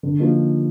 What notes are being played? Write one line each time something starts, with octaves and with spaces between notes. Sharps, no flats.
D3
F3 A#3 D#4